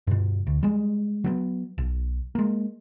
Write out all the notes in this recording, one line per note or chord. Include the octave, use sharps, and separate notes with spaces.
G2 B2
D2
G3 G#3
F#3 A3 B3
B1
G#3 A#3